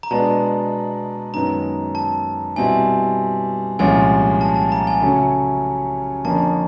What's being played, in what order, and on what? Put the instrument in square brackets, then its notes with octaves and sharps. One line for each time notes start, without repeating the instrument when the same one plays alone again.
[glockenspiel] A#5
[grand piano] B2 G#3 B3 D4 [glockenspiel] A5
[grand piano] F#2 D#3 G#3 B3 D#4 [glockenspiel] A#5
[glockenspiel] A5
[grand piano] B2 G3 C4 E4 [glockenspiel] G#5
[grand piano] C2 A#2 F3 G#3 C#4 [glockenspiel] G#5
[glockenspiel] A5
A5
A#5
G#5
[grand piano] C#3 F#3 A3 C#4
[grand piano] F2 D3 F3 A#3 C#4 [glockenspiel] A5